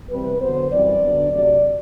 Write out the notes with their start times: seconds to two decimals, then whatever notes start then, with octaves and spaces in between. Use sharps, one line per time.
0.09 E2 C3 G3 C4 B4
0.40 D3 F#3 B3 C5
0.71 F#2 E3 G3 C4 D5
1.02 D3 F#3 B3 D4
1.32 C3 F#3 A3 D5